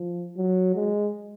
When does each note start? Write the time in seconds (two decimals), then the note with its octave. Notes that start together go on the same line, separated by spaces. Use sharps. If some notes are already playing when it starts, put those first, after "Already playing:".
Already playing: F3
0.36 F#3
0.75 G#3